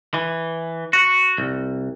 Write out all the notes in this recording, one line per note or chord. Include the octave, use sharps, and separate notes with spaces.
E3
F#4
C2